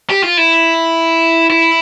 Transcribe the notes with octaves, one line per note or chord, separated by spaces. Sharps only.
G4
F4
E4
E4